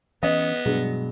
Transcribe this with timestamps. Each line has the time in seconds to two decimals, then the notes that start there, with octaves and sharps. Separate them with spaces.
0.23 E3 B3 C#4 D#5
0.65 G2 B2 F#3 G#3